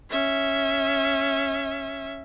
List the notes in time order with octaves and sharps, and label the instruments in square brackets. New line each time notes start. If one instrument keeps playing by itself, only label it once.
[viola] C#4 E5